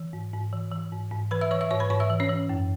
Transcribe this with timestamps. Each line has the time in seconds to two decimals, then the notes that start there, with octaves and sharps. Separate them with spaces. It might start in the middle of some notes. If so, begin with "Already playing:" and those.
Already playing: E3
0.13 G#2
0.33 G#2
0.53 E3
0.72 E3
0.92 G#2
1.12 G#2
1.31 E3 B4 B5
1.41 E5 E6
1.51 E3 C#5 C#6
1.61 E5 E6
1.71 G#2 C#5 C#6
1.80 B4 B5
1.90 G#2 C#5 C#6
2.00 E5 E6
2.10 E3
2.20 C#4 C#5
2.29 E3
2.49 F#2